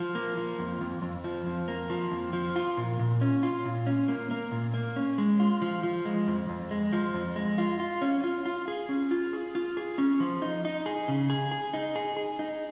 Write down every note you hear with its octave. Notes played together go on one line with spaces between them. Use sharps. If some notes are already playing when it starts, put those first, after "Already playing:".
Already playing: F3
A#3
F3
F2
F2
F2
F3
F2
A#3
F3
F2
F3
F4
A#2
A#2
C#4
F4
A#2
C#4
A#3
A#3
A#2
A#3
C#4
G#3
F4
F3
F3
G#3
F2
F2
G#3
F3
F2
G#3
F4
F4
C#4
F4
F4
G#4
C#4
F4
G#4
F4
G#4
C#4
F3
D#4
D#4
G#4
C#3
G#4
G#4
D#4
G#4
G#4
D#4